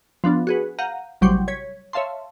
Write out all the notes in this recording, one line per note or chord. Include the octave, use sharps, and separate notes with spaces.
F3 B3 D4 F4
F#4 G#4 B4
F5 F#5 A#5 G6 D#7
A1 C3 F#3 G3 C6 G6
C#5 G#6 B6
C#5 E5 F5 A5 C6